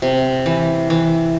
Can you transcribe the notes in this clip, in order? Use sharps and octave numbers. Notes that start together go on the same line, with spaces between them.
C3
E3
E3